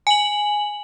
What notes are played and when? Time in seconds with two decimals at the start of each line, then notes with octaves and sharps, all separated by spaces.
0.07 G#5 F#7